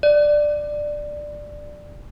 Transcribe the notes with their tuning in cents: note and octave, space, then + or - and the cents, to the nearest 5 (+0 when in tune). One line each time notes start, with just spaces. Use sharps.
D5 +10